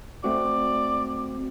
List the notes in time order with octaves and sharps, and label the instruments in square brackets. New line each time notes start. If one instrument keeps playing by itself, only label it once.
[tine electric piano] A3 C4 F#4 [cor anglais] D5